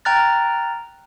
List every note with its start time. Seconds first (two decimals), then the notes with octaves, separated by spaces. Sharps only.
0.05 G5 A#5 F6 F#6 A6